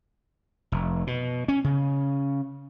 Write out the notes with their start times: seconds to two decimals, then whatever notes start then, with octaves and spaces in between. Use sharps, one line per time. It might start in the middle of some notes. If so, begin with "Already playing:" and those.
0.72 F1
1.07 B2
1.48 C#4
1.64 C#3